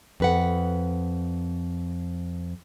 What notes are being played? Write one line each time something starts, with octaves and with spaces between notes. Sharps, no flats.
F2 B4 F#5